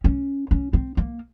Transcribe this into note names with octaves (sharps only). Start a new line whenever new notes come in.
C#4
C#4
C4
A#3